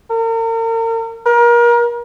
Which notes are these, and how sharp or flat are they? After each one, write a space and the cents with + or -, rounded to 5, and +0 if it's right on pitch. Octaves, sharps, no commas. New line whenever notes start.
A#4 -40
A#4 +30